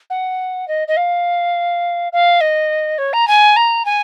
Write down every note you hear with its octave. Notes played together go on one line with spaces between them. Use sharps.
F#5
D#5
D#5
F5
F5
D#5
C#5
A#5
G#5
A#5
G#5